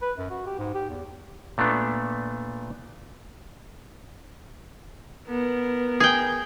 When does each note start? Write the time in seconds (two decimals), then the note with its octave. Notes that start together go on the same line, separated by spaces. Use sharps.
0.02 B4
0.17 F#2
0.30 F#4
0.46 G4
0.59 G#2
0.74 G4
0.89 E2
1.58 A#2 A3 B3 D4
5.27 B3 A#4
6.00 G#4 G5